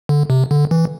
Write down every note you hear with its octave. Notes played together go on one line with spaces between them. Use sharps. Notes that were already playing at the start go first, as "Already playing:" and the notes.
D3
C3
D3
E3